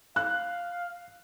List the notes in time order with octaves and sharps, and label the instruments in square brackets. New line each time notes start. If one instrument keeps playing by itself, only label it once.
[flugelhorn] F5 [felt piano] F#6